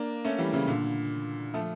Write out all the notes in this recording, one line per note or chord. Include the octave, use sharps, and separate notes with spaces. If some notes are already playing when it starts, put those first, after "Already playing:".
Already playing: A#3 D4
A3 C#4
E3 G3
C#3 E3
A#2 D3
F3 A3